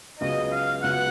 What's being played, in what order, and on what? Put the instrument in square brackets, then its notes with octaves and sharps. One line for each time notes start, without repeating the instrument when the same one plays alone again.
[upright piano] C#2 C#3 F#3 B3 [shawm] D#5
[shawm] F5
[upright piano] C#2 C#3 F#3 B3 [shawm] F#5